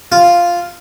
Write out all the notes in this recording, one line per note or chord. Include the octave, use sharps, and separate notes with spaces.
F4